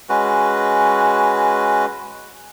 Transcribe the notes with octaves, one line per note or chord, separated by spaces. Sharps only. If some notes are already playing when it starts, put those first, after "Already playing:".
G#3 C#4 F#4 B4